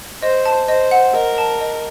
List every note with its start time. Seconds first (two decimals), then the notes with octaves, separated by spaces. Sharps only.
0.22 C5 D#5
0.46 A5
0.68 C5 D#5
0.91 F#5
1.15 A#4 D#5
1.38 A5
1.61 D#5